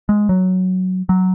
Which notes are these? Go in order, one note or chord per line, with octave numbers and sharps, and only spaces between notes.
G#3
F#3
F#3